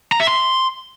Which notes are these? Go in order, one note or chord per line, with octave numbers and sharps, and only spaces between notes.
A#5
E5
C6